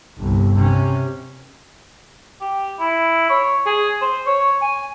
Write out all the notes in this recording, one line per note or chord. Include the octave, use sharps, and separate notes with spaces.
G1 C2
C3 C#4
G4
E4
C#5
G#4
C5
C#5
G#5